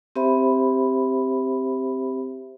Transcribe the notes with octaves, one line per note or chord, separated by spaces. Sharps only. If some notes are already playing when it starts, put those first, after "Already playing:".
C4 G4 C5 E5 B5